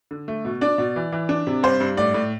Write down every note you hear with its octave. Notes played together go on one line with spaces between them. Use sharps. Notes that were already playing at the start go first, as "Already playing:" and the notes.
D3
A3
B2
D4 D5
B2
E3
E3
D4
C3
G2 C5
G2
A2 D5
A2